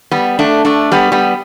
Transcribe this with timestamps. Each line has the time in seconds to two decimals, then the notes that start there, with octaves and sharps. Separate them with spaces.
0.11 G3 B3
0.39 A3 D4
0.65 A3 D4
0.92 G3 B3
1.12 G3 B3